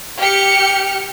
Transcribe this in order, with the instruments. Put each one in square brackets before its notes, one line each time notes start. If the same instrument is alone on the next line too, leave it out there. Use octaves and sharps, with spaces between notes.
[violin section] G4 F6 C#7